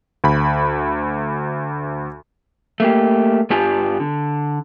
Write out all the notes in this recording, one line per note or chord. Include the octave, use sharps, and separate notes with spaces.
D2 B5
A3 A#3 G4
G2 B3 D4 F4 G4 G#5
D3